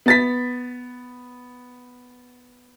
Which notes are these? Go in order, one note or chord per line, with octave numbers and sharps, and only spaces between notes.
B3 A6 B6